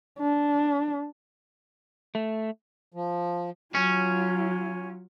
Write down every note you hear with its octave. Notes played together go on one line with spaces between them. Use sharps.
D4
A3
F3
F#3 C#4 F4